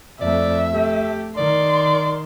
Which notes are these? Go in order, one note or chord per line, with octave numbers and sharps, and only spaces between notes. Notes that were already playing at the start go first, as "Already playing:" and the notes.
F2 A3 D5 E5
A3 G4
D#3 D5 C6